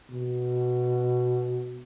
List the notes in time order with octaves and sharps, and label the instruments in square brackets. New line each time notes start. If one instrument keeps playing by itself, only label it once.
[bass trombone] B2